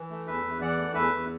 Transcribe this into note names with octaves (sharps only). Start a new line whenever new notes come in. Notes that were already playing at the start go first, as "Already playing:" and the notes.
Already playing: E3
A3
E2 B4 E5
E2
E3 D5 F#5
A3
E2 B4 E5
E2